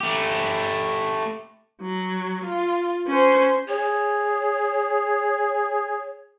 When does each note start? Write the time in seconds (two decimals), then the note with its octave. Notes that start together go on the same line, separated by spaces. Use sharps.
0.01 A3 G4
1.81 F#3
2.45 F4
3.07 C#4 C5
3.68 G#4 C#5